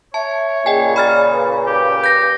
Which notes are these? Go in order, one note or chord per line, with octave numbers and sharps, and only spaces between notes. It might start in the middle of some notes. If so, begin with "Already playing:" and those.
C#5 E5 A5
A#2 C#3 G#4 D#5 G5 G#5
D5 B5 F6 A6
B4
G4
G6 A#6